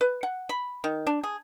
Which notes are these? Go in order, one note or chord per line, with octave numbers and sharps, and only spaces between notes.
B4
F#5
B5
D#3
D4
G#4